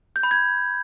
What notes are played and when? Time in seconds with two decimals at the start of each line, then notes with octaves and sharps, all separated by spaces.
0.16 G6
0.23 B5
0.31 G#6